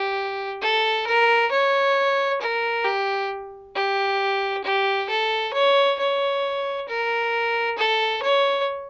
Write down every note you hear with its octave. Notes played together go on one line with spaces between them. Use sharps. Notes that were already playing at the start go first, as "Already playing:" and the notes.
Already playing: G4
A4
A#4
C#5
A#4
G4
G4
G4
A4
C#5
C#5
A#4
A4
C#5